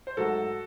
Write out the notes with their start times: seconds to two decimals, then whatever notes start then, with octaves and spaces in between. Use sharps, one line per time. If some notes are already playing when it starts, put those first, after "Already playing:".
0.07 C5
0.17 G#2 F#3 A3 F#4 A4